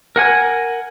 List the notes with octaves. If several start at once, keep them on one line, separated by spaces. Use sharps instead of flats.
A#4 F#5 G#5